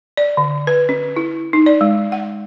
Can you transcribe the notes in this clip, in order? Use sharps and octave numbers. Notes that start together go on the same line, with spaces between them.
D5
D3
B4
C#4
E4
D#4
D5
G#3
F#5